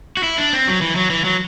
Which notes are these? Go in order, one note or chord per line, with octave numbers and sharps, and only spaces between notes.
F#4
E4
D4
C4
F#3
E3
F#3
E3
F#3